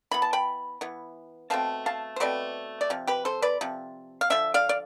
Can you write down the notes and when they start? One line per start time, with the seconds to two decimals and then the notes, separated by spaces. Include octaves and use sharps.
0.11 E3 B3 B5
0.22 A5
0.33 G5 B5
0.81 E3 B3
1.50 B2 A3 C4 F5 A5
1.86 F5 A5
2.16 C5
2.20 B2 A3 C4 B4 D5
2.81 D5
2.90 C3 F3
3.07 G4 B4
3.25 A4 C5
3.42 B4 D5
3.61 C3 F3
4.21 F5
4.30 D3 F3 E5
4.54 D5 F5
4.69 D5